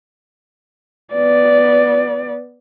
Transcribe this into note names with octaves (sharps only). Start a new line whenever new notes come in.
B3 D5